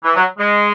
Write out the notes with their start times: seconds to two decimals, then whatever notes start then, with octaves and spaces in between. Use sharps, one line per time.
0.04 E3
0.15 F#3
0.38 G#3